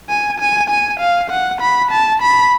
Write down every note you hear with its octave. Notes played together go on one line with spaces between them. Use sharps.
G#5
G#5
G#5
F5
F#5
B5
A5
B5